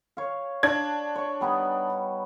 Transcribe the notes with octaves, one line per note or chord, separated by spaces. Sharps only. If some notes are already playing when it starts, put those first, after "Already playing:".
C#5 F5
D4 A5 G#6
C#5 C#6
G3 B3 D#4